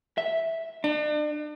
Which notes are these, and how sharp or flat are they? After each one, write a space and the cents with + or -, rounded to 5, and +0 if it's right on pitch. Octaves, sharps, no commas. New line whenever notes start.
E5 -5
D4 +40